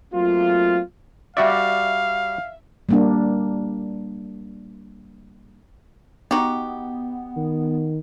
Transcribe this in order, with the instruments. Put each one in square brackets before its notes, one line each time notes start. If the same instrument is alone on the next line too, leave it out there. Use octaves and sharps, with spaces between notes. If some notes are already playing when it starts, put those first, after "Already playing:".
[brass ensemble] F#3 A3 A#3 C4 F4
[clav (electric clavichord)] G3 F#4 D5 [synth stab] E5 [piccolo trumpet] F5
[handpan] G3 A#3 D4
[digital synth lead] B3 [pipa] D#4 F#4 G4
[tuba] D#3